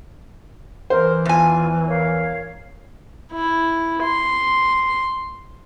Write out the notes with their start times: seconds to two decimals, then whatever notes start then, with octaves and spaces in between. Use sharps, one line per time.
0.90 E3 A#4 C5
1.25 E2 F4 G#5
1.88 A#4 C#5 F5
3.32 E4
4.03 C6